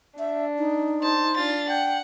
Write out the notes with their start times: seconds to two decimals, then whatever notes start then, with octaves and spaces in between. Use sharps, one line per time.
0.19 D4 E5
0.58 D#4
1.03 C5 A5
1.37 D4 F4 A6
1.69 F#5 G5